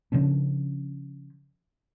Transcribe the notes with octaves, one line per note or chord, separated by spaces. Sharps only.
C#3 F3 C#4 D4